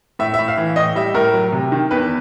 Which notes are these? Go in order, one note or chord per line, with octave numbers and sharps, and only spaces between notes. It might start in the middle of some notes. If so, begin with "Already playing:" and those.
A2 E5
E5
A2
F5
E3
A2 D#5
G3 E5
A2 A#4
F#3
C3
D#3
E2 B4